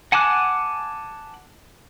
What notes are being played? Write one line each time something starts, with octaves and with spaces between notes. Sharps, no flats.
F#5 G#5 A5 D6 F#6